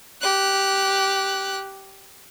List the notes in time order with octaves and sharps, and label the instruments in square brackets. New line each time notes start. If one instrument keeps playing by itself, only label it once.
[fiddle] G4 F#6